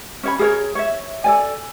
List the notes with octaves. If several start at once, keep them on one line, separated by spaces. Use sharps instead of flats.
C#4 C#5 B5
G#4 A#4 C#5
C#5 E5
A4 D5 G#5